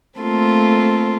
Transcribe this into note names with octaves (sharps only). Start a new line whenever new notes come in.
A3 A#3 C4 F4 A4